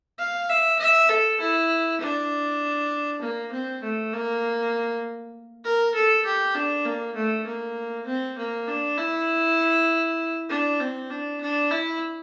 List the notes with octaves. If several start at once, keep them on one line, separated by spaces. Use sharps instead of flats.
F5
E5
E5
A4
E4
D4
A#3
C4
A3
A#3
A#4
A4
G4
D4
A#3
A3
A#3
C4
A#3
D4
E4
D4
C4
D4
D4
E4